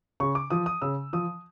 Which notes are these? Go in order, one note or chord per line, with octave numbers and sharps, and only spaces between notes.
C#3 C#6
D6
F3 D#6
D#6
C#3 E6
F3 D#6